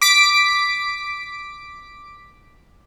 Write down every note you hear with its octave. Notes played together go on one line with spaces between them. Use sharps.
D6 B6 D7